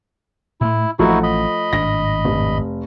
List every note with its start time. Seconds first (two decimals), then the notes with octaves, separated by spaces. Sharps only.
0.61 A2 A3 E4
0.99 A1 F3 A3 D#4 E4 F#4 F#5
1.23 D#5 B5
1.73 G#1 A2 D4 A#6
2.25 F1